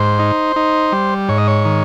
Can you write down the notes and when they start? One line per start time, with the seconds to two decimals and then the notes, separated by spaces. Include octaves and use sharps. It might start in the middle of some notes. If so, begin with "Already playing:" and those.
Already playing: G#2 C5
0.19 D#4
0.56 D#4
0.92 G3
1.29 G#2 C#5
1.38 D#5
1.47 C#5
1.65 D#3